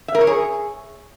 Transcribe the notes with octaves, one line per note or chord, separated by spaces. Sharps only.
E5
A#4
C#5
G#4